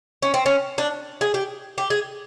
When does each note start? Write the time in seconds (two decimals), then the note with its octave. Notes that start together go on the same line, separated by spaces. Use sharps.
0.22 C#4
0.34 C4
0.46 C#4
0.78 D4
1.21 G#4
1.34 G4
1.78 G4
1.90 G#4